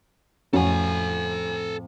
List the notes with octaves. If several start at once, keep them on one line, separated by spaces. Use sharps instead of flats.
F2 A2 C#4 F#4 A4 G#5